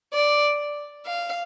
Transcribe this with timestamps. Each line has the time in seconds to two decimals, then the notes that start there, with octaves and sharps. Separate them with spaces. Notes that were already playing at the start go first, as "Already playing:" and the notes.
0.14 D5
1.06 F5